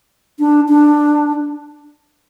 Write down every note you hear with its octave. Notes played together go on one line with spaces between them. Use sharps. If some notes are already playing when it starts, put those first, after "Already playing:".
D4
D4